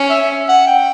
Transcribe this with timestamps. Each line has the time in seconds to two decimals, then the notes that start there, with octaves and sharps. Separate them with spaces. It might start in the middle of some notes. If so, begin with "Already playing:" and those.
Already playing: C#4
0.10 E5
0.48 F#5
0.67 G5